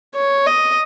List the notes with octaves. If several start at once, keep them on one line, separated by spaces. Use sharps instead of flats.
C#5
D#5